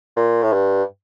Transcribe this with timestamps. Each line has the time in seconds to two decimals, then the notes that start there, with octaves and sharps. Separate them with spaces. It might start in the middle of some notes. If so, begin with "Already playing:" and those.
0.16 A#2
0.43 A2
0.53 G2